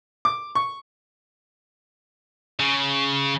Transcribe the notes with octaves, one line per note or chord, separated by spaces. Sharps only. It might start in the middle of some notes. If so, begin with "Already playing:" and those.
D6
C#6
C#3